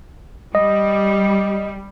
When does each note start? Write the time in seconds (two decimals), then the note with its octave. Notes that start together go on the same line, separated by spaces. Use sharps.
0.55 G3 D#5